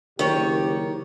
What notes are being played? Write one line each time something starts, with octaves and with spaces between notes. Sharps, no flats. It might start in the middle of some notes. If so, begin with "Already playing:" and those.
F#1 D#3 G4 C#5